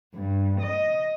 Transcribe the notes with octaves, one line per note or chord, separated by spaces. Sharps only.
G2
D#5